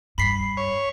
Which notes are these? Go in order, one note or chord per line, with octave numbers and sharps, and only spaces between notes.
G2 B5 B6 C7
C#5